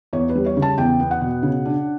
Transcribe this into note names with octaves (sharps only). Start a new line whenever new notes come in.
E2 C#5
B4
G3
C#5
C#3
A5
E2 G5
B3
F#5
B2
C#3
D4